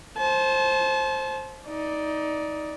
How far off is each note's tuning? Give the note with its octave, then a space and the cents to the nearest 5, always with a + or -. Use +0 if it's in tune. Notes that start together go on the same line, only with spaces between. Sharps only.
C5 +15 A5 -35
D#4 +20 D5 +0